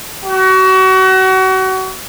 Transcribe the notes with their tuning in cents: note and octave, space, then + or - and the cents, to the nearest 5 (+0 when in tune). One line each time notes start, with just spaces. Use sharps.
F#4 +30